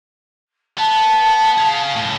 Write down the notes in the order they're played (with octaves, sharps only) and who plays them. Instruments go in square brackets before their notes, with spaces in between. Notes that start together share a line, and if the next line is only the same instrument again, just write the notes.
[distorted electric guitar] B3 [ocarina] A5
[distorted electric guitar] G#4 F5
C#2 A2